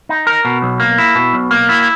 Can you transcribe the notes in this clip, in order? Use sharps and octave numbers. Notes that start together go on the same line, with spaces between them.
D#4
A#4
B2
B1
A#3
E4
B2
B1
A#3
E4